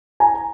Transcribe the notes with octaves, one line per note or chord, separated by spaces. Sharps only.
G#5 A#5